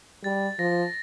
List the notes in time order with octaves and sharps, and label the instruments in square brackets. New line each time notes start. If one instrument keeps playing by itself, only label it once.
[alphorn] G3 [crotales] A6
[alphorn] F3 [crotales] A#6